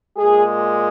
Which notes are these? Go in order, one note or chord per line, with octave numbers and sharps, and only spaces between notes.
A#2 G#3 G#4